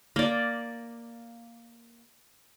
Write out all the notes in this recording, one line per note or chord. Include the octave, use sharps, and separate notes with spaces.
A#3 D5